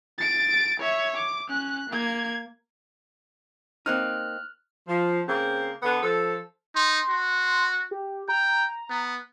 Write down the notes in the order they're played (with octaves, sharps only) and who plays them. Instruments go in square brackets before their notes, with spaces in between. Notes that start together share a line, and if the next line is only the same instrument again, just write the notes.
[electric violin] A6 D7
C#5 E5
D6
C#4 F#6
A#3 G#6
[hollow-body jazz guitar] A#3 C4 D#4 [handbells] F6 F#6
[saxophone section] F3
C#3 A#3 C4
D3 B3
F3 A4
[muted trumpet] D#4 [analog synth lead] C6
[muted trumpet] F#4
[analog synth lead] G4
[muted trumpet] G5 [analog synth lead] A#5
[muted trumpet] B3